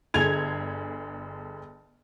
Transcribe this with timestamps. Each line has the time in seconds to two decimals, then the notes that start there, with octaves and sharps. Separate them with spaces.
0.14 G1 D3 G#4 G#6 F7